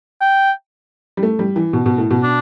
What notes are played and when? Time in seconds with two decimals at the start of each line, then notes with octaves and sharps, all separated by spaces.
0.21 G5
1.17 G3
1.23 A3
1.39 G3
1.56 E3
1.73 B2
1.86 B2
1.98 A2
2.11 B2
2.23 D4